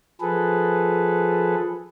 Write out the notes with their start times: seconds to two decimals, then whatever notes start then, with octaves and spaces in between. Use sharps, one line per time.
0.21 F3 G#4 A4 B4